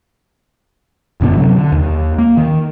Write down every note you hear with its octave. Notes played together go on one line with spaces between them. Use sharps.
F#1 B2 D3 B3
C3 F#3
D3
D#2
A#3
D#3